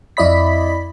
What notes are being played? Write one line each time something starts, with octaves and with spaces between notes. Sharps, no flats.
F2 E4 D5 D#5 B5 B6